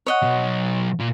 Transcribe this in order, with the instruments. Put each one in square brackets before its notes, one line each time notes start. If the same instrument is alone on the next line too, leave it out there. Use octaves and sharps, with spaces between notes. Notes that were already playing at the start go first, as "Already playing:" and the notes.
[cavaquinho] C#5 D#5 F#5
[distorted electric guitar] B1 F#3
A#2